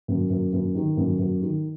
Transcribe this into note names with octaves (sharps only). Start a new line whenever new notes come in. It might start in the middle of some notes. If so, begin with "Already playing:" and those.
F#2
F#2
F#2
D#3
F#2
F#2
D#3